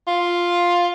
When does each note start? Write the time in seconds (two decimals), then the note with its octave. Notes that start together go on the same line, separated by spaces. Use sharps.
0.07 F4